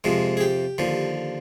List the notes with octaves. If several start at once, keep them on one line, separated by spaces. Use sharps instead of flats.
F2 C3 F3 G#3
G#4
G4
D#2 D3 F3